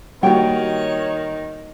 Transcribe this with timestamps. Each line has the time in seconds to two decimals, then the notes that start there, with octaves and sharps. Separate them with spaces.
0.23 D#3 G3 A#3 F#4 C#5 G5